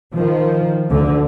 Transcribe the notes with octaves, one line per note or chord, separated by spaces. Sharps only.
D#3 F3
D2 D3